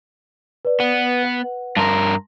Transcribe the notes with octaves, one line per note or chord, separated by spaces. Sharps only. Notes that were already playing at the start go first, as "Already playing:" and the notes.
B4 D5
B3
B4 F#5
G2 A#4 A5 C6 A#6